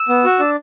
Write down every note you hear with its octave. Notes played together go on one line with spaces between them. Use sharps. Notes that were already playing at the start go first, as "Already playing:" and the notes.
Already playing: E6
B3
F#4
D4